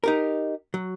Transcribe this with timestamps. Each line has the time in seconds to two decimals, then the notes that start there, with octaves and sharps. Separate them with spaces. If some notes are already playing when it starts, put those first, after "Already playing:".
0.04 D#4 G4 A#4
0.74 F#3